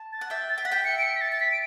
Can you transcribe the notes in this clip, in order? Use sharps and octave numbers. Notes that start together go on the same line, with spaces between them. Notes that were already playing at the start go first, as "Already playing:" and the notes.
Already playing: A5
A6
F#5
E5 G5 A6
A6
G5
F#5 B6
E5 G5
C#7
D7
C#7
B6
A6
A6
B6
D7